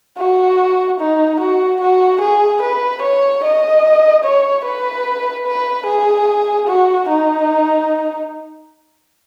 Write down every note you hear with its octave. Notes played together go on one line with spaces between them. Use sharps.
F#4
D#4
F#4
F#4
G#4
B4
C#5
D#5
C#5
B4
B4
G#4
F#4
D#4